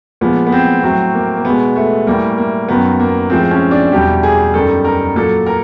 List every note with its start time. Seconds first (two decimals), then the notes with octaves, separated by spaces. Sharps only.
0.21 A#2 F3 G#3 B3
0.47 B3
0.52 C4
0.83 A2 F#3 C4
1.14 A#3
1.37 A#3
1.45 B2 G#3 B3
1.76 A3
2.07 A2 E3 G3 A#3
2.38 A#3
2.68 F#2 D#3 F#3 B3
3.00 A#3
3.30 A2 F3 G#3 C4
3.51 C#4
3.71 D4
3.92 E2 B2 G3 G4
4.23 G#4
4.54 F#2 D#3 G3 A4
4.85 A#4
5.16 A#2 F#3 A4
5.46 A#4